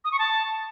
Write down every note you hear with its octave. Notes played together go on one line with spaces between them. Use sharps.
D#6
C#6
A5